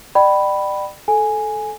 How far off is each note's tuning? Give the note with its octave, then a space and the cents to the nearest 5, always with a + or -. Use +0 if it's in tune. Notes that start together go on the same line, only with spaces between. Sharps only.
D5 +35 G5 -25 B5 +0
A4 -15 G#5 +0